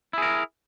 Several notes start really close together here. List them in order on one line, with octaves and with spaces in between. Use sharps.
E4 G#4 A#4